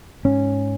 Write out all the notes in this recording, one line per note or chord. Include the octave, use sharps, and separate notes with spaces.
G#2 C#4